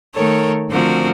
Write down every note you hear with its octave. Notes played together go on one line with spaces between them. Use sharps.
D#3 A3 A4 A#4 C#5
D3 F3 A3 C4 F#4 A#4